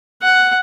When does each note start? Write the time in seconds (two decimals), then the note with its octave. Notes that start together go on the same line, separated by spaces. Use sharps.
0.22 F#5